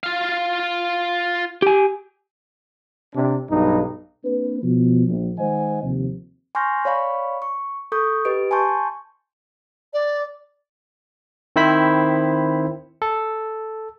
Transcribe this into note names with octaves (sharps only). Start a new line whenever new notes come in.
F4 F5
G4 G#5
C3 D4
B1 G2 D#4
A#3 C4 D4 B4
B2 F3
A#1
D#3 G#3 C5 D#5 F#5 G#5
D#2 C3 F3
G#5 C6 C#6 F6 G6 A#6
C#5 D5 F5 B5 C#6
C#6
A4 C#6 D#6 G6
G4 B4 D#5 D7
G#5 A5 C6 C#6 G6
D5
D#3 C4 E4 C5 B5 B6
A4